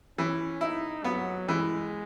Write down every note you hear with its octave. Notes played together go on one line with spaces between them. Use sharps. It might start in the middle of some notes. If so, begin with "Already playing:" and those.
E3 C#4
D#4 E4
F#3 B3
E3 G#3